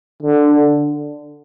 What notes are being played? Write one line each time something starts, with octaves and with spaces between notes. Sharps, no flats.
D3